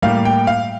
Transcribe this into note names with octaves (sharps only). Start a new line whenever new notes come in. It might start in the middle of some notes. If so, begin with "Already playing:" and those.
A2 G3 A#3 F5
G5
F5